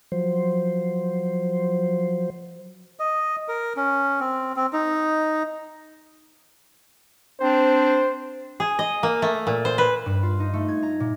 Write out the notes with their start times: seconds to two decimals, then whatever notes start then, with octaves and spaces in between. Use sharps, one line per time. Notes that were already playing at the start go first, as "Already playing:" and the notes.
0.12 F3 F#3 C5
2.99 D#5
3.48 A#4
3.76 C#4
4.20 C4
4.56 C4
4.73 D#4
7.40 C4 D4 C5
8.60 G#4
8.79 D#5
9.03 A#3
9.22 A3
9.47 A#2
9.65 C5
9.78 B4
10.06 G2
10.23 F4
10.40 D#4
10.54 A3
10.68 G#6
10.83 A#5
11.00 A#2